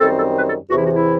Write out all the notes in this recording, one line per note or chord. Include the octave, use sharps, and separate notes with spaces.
F#2 D#3 G3 C4 A4
A4
B4
A4
E2 C3 E3 F#4
E4
F#4
E4